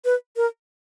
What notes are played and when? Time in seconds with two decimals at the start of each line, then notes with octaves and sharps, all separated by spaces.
0.05 B4
0.36 A#4